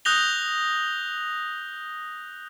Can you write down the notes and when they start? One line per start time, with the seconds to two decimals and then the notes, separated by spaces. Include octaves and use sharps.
0.05 D#6 F#6 G6 A#6 F7 G7